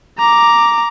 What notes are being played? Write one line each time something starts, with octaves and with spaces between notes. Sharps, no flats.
A#5 D6